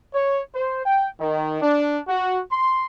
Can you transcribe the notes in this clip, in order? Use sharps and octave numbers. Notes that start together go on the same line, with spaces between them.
C#5
C5
G5
D#3
D4
F#4
C6